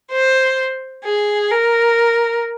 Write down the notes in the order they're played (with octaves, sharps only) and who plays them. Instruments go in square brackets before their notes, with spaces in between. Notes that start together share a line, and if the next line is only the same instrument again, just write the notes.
[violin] C5
G#4
A#4